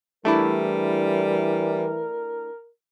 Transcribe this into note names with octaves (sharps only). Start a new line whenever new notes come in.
E3 G3 A3 D4 E4 A#4